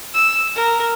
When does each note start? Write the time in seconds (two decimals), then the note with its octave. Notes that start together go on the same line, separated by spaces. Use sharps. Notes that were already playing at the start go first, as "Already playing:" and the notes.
0.15 E6
0.55 A#4